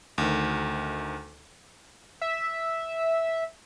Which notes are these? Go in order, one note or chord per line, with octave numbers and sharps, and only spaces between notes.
D2 D#3
E5